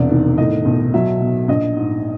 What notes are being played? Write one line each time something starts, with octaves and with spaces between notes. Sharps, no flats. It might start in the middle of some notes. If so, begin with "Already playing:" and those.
Already playing: E1 C2 D5
D#3
A2 D#5
B1
F#3 E5
B2
A#1 D#5
G#2